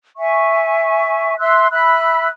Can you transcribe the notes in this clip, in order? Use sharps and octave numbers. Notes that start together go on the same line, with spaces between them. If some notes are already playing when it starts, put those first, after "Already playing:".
E5 G#5 C#6
E5 C6 E6 F#6
E5 B5 E6 F#6